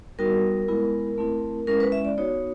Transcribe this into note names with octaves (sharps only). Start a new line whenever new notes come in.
G3 B3 D#4 F#4 A#4
G#3 B3 E4
A3 C4 E4
G#3 C#4 E4 A#4
B4
E5
D5
B3 D#4 F#4 C#5